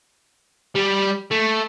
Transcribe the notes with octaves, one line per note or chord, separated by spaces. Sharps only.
G3
A3